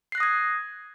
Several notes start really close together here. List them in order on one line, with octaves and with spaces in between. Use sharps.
C7 F#6 A#6 D#6 G#6